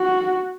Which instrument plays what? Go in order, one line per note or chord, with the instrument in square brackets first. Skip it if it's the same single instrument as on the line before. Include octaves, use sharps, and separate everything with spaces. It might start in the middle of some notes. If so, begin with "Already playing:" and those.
Already playing: [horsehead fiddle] F#4